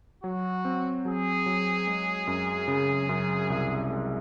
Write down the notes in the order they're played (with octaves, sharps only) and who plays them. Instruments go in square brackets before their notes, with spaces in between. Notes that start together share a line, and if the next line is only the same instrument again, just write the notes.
[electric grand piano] F#3 [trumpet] F#4
[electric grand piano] C4
[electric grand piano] F#3 [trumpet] G#4
[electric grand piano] F#3
G#3
F#2
C#3
F#2
C2
G#3